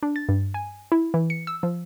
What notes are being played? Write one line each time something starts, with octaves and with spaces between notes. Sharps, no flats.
D4
A6
G2
G#5
E4
E3
C#7
E6
F3